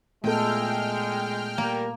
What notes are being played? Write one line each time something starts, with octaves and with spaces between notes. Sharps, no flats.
A#2 G#3 A3 B3 A4 G5 F6
G3 A#3 A#4